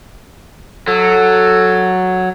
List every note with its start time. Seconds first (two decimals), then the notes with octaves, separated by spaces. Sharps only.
0.88 F#3 A4